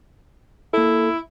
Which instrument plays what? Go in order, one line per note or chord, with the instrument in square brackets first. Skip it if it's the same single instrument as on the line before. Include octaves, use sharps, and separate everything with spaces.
[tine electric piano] A#3 A4 [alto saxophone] E4